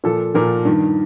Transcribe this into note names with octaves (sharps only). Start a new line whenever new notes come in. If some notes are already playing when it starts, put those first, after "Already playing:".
A#2 F3 A4
A#2 F3 A#4
G2 D#3